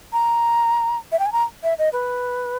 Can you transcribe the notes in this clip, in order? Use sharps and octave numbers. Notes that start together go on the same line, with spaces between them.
A#5
E5
G5
G#5
A#5
E5
D#5
B4